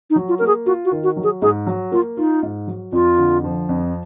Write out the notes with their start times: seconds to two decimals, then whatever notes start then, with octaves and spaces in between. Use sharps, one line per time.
0.10 D#4
0.16 F#3
0.29 F4
0.39 A#3 A#4
0.47 G#4
0.66 F4 F#4
0.85 F#4
0.92 D#3
1.04 F#4
1.17 F#3
1.24 G#4
1.42 G#2 G#4
1.67 F#3
1.92 A#3 F4
2.17 D#4 F4
2.43 G#2
2.67 F#3
2.92 F2 F4
3.18 D3
3.44 F3
3.69 F2